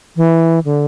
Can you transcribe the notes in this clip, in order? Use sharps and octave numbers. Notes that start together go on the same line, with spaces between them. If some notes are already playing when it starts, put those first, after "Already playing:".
E3
D3